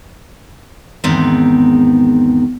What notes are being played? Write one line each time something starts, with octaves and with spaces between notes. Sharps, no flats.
E2 G#2 D#3 B3 C4